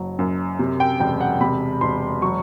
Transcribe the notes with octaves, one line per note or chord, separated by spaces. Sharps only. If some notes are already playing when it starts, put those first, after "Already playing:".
Already playing: F#1 F#3
F#2
C3
G5
E1 G5
F#5
C3 B5
E1 C6
F#3 C#6